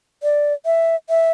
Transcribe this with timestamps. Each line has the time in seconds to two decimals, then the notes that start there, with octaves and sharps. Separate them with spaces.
0.23 D5
0.66 E5
1.09 E5